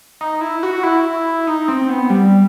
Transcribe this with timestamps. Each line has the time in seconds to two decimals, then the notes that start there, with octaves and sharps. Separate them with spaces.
0.21 D#4
0.41 E4
0.63 F#4
0.83 E4
1.47 D#4
1.68 C4
1.89 B3
2.10 G3